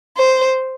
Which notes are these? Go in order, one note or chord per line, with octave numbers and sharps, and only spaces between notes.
C5